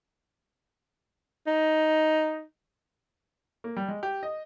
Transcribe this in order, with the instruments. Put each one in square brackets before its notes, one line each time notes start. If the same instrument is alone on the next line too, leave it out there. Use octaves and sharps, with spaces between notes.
[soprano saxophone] D#4
[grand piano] A#3
G3
G#3
G4
D#5